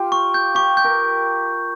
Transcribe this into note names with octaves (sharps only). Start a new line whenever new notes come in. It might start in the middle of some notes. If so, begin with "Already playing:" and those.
Already playing: F4 G4
C#6
G6
G4 C#6
G6
A#4